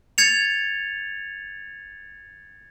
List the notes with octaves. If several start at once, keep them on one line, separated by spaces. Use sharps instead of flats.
G#6 A6 C#7 F7